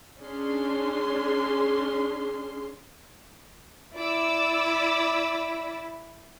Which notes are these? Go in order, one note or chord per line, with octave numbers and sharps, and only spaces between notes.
C#4 D4 G#4 C6
E4 D5 D6 E6